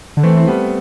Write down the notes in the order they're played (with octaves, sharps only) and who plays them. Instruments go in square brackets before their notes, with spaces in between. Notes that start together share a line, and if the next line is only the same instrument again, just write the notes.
[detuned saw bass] D3
[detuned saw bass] E3 [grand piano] A3 C4
[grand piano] C4
G3 B3